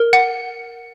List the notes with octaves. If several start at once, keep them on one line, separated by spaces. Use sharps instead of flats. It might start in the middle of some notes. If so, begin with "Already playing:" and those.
Already playing: A#4
F#5